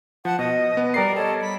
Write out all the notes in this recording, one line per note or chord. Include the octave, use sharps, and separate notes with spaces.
F3 F#5 A5
B2 D#5
B3
G3 A#4 D5 G5 C7
A4 C#5 D#5
B5